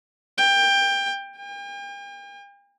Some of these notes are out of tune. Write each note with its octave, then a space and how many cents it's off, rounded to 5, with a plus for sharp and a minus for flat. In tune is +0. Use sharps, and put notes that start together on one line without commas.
G5 +20
G5 +45